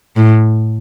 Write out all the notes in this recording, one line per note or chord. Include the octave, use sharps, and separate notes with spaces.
A2